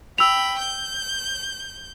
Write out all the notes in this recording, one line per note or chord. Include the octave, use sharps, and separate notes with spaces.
G5 B5 E6 F7
G6